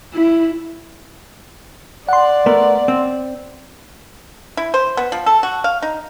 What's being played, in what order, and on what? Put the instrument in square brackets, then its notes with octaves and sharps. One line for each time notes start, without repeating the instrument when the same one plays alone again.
[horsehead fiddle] E4
[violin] D5 [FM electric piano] F#5 C6
[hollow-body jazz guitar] A3 B3 A#4
C4
[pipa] E4
C5
B3
F3
A4
F#4
F5
D#4